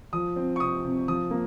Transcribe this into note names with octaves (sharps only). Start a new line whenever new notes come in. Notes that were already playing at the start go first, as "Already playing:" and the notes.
F3 D#6
C4
C#6
C3 D#6
C3
F3 D#6
A#3